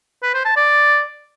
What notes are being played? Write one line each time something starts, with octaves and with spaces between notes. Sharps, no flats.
B4
C5
A5
D5